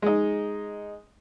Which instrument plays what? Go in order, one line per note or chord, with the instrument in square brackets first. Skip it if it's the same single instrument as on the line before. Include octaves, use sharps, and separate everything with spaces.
[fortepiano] G#3 D#4